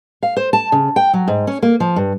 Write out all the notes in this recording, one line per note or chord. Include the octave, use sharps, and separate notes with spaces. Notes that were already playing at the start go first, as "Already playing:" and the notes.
F5
C5
A5
C#3
G5
F#3
G#2
C#4
A#3
F3
G2